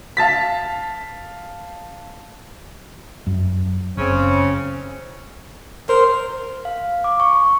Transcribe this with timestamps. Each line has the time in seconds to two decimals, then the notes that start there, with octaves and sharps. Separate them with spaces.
0.17 F5 A5 A6 B6
3.27 F#2
3.97 F#1 C#3 C4 C#4
5.89 A#4 C5
6.65 F5
7.04 D6
7.20 C#6